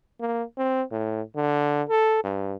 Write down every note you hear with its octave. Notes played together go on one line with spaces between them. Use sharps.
A#3
C4
A2
D3
A4
G2